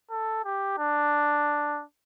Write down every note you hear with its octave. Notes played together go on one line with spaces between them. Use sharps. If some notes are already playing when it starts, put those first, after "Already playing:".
A4
G4
D4